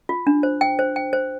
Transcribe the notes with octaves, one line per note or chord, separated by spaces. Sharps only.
F4
D4
C5
G5
C5
G5
C5